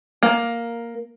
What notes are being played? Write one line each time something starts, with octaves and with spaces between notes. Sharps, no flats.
A#3